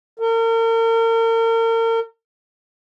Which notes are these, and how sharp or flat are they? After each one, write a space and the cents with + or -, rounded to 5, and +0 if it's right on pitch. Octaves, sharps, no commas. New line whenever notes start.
A#4 -40